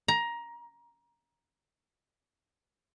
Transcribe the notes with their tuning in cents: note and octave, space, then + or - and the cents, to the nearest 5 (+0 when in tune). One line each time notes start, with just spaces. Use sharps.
A#5 +15